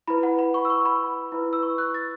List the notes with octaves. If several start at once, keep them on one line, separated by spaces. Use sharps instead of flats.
E4 B4 B5
F#5
B5
C#6
E6
C#6
B5
E4 B4
E6
C#6
F#6
A6